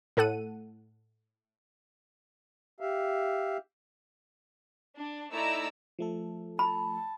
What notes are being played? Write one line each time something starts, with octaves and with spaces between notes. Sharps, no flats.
A2 A4 F#5 D#7
G4 E5 F5
D4
A3 D#4 E4 D5 A#5 E6
F3 A3 A4
A5 B5